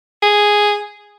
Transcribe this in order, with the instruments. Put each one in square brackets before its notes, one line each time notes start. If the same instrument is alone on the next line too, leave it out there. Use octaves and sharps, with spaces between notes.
[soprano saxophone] G#4